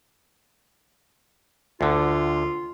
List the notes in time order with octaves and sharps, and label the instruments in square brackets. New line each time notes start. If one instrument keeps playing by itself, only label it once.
[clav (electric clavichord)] D2 D3 [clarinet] F4